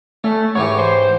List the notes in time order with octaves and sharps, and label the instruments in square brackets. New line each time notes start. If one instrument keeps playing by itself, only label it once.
[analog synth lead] A3 [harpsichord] C#4
[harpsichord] G#2 E3 G4 [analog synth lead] C#5
[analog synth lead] C5